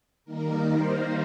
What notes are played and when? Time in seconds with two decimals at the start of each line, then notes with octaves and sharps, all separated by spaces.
0.24 D#3 G3 A#3 D#4 A#4
0.67 C5